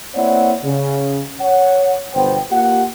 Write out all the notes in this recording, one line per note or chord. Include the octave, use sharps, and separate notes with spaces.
A#3 C4 E4 C#5 D5 F#5
C#3
C#5 F#5
G1 B2 B3 C5 G5
A#3 F4 G4 F#5